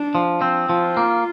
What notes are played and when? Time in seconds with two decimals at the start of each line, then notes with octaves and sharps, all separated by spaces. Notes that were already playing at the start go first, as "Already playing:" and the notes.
Already playing: D4
0.15 F3
0.41 C4
0.69 F3 F4
0.97 A#3